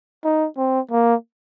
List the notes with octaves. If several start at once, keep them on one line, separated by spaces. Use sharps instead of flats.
D#4
C4
A#3